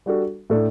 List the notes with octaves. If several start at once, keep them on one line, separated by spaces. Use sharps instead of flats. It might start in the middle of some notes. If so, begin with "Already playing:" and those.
G3 D4 F#4 A4
A2 A3 D4 A4